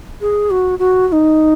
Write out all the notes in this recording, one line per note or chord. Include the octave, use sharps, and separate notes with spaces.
G#4
F#4
F#4
F#4
D#4